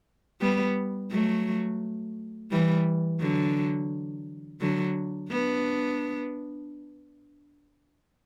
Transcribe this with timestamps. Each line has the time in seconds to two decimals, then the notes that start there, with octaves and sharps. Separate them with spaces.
0.41 G3 B3
1.11 F#3 A3
2.51 E3 G3
3.21 D3 F#3
4.61 D3 F#3
5.31 B3 D4